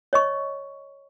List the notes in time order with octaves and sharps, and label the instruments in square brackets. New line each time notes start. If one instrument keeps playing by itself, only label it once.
[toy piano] C#5 D#5 C#6